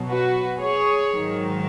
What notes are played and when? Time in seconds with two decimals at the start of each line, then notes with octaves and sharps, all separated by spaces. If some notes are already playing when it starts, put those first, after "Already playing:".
Already playing: B2 F#3
0.08 F#4 B4
0.60 G#4 C#5
1.11 G#2 D#3 F#3